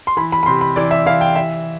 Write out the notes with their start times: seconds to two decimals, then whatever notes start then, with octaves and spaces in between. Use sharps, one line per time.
0.07 C6
0.17 E3 B5
0.32 B5
0.43 B5
0.46 C3 C6
0.61 B5
0.76 E3 D5
0.91 E5
1.06 E3 F5
1.21 G5
1.35 E3 E5